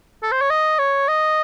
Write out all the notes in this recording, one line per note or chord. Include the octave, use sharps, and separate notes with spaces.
A4
C5
C#5
D#5
C#5
D#5